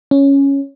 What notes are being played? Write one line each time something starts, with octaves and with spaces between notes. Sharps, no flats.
C#4